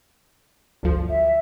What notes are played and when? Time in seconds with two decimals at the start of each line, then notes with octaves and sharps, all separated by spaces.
0.83 G1 D2 F3
1.10 E5